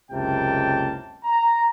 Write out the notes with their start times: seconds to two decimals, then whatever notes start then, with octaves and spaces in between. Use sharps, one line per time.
0.11 F#1 C#2 C3 A#3 G5 A5
1.24 A#5